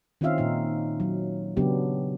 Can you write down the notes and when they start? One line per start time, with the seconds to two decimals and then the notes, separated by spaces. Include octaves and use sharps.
0.21 D#3 C4 C#4 F4 E5 F5
0.38 A#2 D#4
1.00 F#3
1.57 C#3 F#3 B3 D4 G4